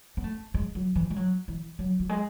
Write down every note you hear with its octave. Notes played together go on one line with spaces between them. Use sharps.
B3
A3
G#3
F#3
E3
G#3
F#3
E3
F#3
F#3
G#3